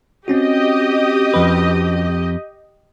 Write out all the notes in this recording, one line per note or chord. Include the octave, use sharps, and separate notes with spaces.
C4 C#4 F#4 G4 D#5
F2 B4